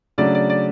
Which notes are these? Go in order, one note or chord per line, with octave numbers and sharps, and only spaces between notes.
C#3 F#3 A3 D4 D5
D5
D5